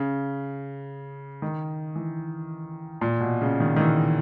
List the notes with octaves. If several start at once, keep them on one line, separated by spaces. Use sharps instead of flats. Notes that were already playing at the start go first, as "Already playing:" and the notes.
Already playing: C#3
D#3
E3
A#2
B2
C#3
D#3
D#3
E3